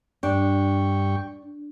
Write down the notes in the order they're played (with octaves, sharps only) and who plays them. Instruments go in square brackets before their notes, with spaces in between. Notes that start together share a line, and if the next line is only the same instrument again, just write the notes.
[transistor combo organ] G2 G5 C#6 [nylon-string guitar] D4